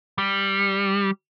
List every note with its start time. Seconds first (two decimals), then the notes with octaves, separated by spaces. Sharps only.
0.18 G3